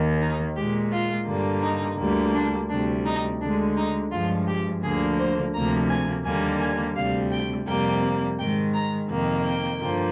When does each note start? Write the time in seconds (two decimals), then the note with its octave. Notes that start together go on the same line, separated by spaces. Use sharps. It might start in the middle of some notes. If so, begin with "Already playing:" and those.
Already playing: D#2 D#3 A#3
0.21 D#4
0.56 A#2 G#3 G4
0.91 F4
1.27 G2 D3 G3 A#3
1.63 D#4
1.98 D2 D3 G3 A#3
2.34 D4
2.69 D2 C3 G3 D4
3.05 D#4
3.41 D2 D3 G#3 D4
3.77 D#4
4.11 G2 F3 G#3 F4
4.47 G4
4.83 D2 D3 F3 A#3 G#4
5.18 C5
5.54 D2 C3 F3 A#3 A#5
5.90 G#5
6.25 D#2 D3 G3 A#3 G#5
6.60 G#5
6.96 D2 C3 G3 F5
7.31 G5
7.67 F2 C3 G3 A#3 G5
8.39 G#2 D#3 G#3 G5
8.74 A#5
9.09 F2 C3 D#3 A#3
9.45 G5
9.80 G2 D3 F3 A#3